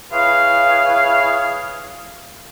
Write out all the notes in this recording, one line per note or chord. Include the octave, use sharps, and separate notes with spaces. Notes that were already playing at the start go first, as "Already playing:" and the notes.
E4 G#4 B4 C#5 F5